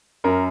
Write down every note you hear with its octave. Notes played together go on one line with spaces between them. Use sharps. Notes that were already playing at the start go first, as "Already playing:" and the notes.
F#2 A#4